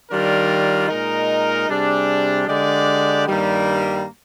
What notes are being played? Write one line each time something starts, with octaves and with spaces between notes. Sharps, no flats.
D#3 G3 D4 F4 A#4
A#2 G#3 D#4 A#4
C3 G3 D4 G#4
D3 G#3 D4 G4 D5
G2 D#3 G3 A#3